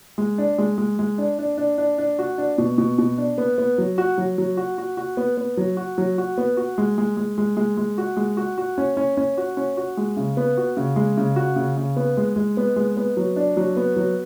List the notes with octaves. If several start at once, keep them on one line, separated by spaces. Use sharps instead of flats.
G#3
D4
G#3
G#3
G#3
D4
D4
D4
D4
D4
F#4
D4
B2
B2
B2
D4
B3
B3
F#3
F#4
F#3
F#3
F#4
F#4
F#4
B3
B3
F#3
F#4
F#3
F#4
B3
F#4
G#3
G#3
G#3
G#3
G#3
G#3
F#4
G#3
F#4
F#4
C#4
C#4
C#4
F#4
C#4
F#4
G#3
C#3
B3
F#4
C#3
G#3
C#3
F#4
C#3
C#3
B3
G#3
G#3
B3
G#3
B3
F#3
D4
F#3
B3
F#3